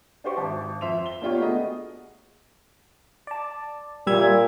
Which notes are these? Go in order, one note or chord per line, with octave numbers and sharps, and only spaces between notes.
D4 F#4 G4 C5 D5 C#6
G#1 E5 A5
F2 E5 C6 F7
G7
A#3 B3 D4 F4 G4 C#5
A3 B3 F#4 G#4 D#5
D5 A5
A#2 G3 E5 G#6